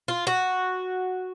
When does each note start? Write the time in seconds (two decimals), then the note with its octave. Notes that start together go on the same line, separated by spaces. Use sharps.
0.08 F4
0.27 F#4